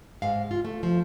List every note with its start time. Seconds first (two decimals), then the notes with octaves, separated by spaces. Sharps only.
0.22 G#2 G#3 F5
0.51 F4
0.65 A3
0.83 F3